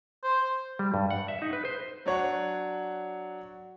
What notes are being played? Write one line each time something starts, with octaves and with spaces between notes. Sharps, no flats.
C5
G3
G2
F#5
E5
D#4
B4
C5
F#3 D4 C#5 F#5